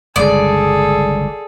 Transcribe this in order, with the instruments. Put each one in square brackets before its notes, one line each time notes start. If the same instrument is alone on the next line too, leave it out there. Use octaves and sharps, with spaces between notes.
[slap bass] G1 C#2 G2 [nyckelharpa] G#4 A4 [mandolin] D5